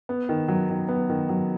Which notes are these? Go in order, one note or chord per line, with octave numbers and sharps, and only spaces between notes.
B3
D#3
F#3
D#3
B3
D#3
F#3